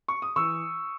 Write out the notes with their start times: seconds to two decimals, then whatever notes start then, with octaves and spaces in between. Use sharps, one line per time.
0.08 C#6
0.22 D#6
0.36 E3 C#6 E6